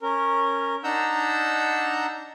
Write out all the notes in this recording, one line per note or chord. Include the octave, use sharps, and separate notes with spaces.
C#4 A#4
D4 D#4 F#5 A#5 E6 G6